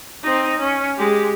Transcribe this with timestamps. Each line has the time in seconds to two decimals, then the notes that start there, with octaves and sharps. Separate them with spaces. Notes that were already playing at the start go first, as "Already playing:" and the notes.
0.23 C4 D#4
0.59 C#4
0.97 G#3 G4